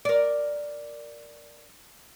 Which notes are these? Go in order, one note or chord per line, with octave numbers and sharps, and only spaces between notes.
A#4 D5